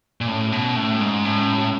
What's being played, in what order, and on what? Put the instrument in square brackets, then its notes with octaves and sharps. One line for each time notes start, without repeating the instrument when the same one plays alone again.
[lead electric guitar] A#2
[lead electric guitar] A2 [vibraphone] C#4
[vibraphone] F#4
[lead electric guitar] B2
[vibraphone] C#4
[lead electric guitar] A2 [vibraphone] C#4
[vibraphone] G#3
[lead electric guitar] G#2
[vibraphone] C#4
[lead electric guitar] A2 [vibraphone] C#4
[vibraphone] C#4
F#4